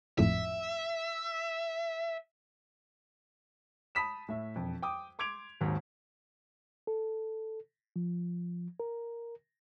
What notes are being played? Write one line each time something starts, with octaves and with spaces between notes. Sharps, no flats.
G#1 F2 A2 E5
A5 B5 D#6 B6 E7
A2 E5
E1 F2
G5 D6 D#6
C6 D6 G#6 D7 F7
G#1 D#2 G#2 F#3
A4
F3
A#4